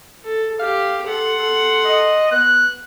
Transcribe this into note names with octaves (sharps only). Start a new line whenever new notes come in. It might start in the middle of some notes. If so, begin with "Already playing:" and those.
A4
G4 F5
A4 F#5 C6
A4
D#5
B3 F#6